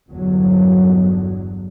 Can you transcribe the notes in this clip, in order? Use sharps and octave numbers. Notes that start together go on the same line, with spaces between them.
G1 E2 D3 F#3